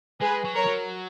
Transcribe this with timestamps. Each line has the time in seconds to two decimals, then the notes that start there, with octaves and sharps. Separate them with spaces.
0.21 G#3 G#4 B4
0.44 F#3
0.56 A#4 C#5
0.66 F#3